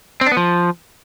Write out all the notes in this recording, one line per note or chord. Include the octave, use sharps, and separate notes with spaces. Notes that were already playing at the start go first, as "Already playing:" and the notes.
C4
D4
B3
F3